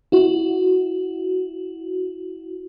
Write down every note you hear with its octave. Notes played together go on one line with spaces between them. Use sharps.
E4 F#4